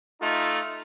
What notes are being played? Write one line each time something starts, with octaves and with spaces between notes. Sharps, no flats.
A3 D#4 F4